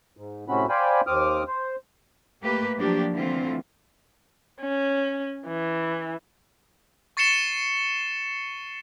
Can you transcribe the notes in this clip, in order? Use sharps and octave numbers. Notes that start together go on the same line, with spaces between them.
G#2
A2 C3 C4 C#4 F#4 B5
C5 D5 F5 G5 G#5 B5
D#2 C4 D6 D#6 F6
C5
A3 A#3 G4 B4
F3 F#3 A#3 D4 G4
D3 E3 A3 C4 F4
C#4
E3
C#6 A6 C7 C#7 E7 G7